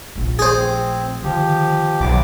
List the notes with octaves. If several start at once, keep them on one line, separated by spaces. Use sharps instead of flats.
A#1 A3
G#4 C5
C4
D3 D#3 F3 G4
B1 D#3 D6